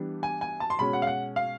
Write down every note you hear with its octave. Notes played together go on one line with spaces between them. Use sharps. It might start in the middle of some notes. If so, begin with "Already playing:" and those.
Already playing: E3 G3 B3 D4
G#5
G#5
A5
C6
B2 G#3 C#4 B5
F#5
F5
F#5
F5